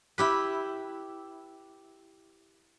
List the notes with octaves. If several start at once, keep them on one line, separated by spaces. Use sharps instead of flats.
E4 G4 B4